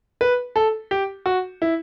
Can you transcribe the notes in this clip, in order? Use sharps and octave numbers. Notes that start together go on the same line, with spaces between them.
B4
A4
G4
F#4
E4